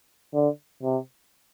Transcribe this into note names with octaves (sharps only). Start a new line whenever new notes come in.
D3
C3